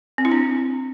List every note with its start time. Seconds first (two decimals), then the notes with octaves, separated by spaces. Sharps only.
0.18 C4
0.25 E4
0.31 D4